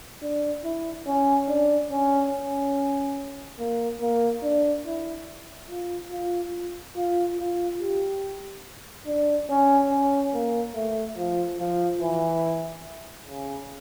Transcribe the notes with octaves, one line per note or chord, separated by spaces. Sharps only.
D4
E4
C#4
D4
C#4
C#4
A#3
A#3
D4
E4
F4
F4
F4
F4
G4
D4
C#4
C#4
A#3
A3
F3
F3
E3
C#3